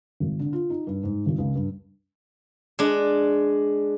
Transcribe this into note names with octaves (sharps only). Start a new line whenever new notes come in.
G#1
D3
F4
D#4
G2
G#2
G#1
C#2
G2
G#3 D4